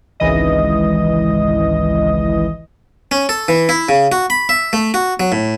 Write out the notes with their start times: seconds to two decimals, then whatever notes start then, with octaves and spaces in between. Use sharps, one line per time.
0.20 G#1 C#2 E3 D#5
3.11 C#4
3.29 A4
3.48 E3
3.69 E4
3.89 C#3
4.12 F#4
4.30 B5
4.49 E5
4.73 A3
4.94 F#4
5.20 F#3
5.32 A2